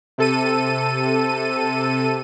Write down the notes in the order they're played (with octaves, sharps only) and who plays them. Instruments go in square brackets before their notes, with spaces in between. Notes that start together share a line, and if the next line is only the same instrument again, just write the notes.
[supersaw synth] C3 A4 D#7